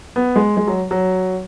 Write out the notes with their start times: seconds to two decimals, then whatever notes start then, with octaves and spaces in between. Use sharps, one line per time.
0.16 B3
0.36 G#3
0.57 G#3
0.67 F#3
0.91 F#3